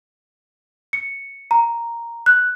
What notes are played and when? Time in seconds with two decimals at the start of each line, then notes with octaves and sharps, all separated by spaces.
0.93 C#7
1.51 A#5
2.26 F#6